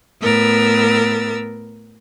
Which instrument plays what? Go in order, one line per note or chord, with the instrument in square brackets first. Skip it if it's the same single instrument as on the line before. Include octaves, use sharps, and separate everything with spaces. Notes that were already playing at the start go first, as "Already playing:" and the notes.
[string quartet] A2 B3 A#4 E6 A6